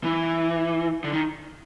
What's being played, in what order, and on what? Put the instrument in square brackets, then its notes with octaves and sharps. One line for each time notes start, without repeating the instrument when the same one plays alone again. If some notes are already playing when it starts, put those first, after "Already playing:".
[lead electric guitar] E3
D3
D#3